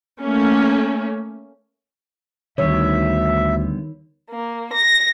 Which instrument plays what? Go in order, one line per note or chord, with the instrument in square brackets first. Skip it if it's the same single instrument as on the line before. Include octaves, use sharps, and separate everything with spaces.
[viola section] A3 A#3 C#4
[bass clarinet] D2 [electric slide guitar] D3 G3 B3 [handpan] D#3 C#5 [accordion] E5
[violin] A#3
A#6